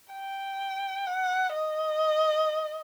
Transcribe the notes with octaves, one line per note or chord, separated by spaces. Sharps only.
G5
F#5
D#5